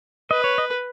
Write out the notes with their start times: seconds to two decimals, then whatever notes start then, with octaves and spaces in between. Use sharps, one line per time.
0.30 B4 D#5
0.44 C#5
0.58 D#5